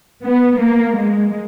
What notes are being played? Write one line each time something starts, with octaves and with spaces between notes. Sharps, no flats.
B3
A#3
G#3